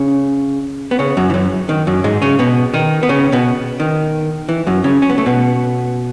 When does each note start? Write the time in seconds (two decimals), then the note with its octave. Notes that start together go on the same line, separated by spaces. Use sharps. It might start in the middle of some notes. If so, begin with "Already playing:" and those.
Already playing: C#3 C#4
0.91 B3
0.99 C#3 C#4
1.17 F#2 F#3
1.30 E3
1.34 F#2 F#3
1.69 D#3
1.87 F#2 F#3
2.04 G#2 G#3
2.22 C#3 C#4
2.39 B2 B3
2.74 D#3 D#4
3.03 B3
3.09 C#3 C#4
3.32 B2 B3
3.80 D#3
4.49 E3
4.67 F#2 F#3
4.84 C#3 C#4
5.02 C#4
5.10 B3
5.18 A3
5.26 B2 B3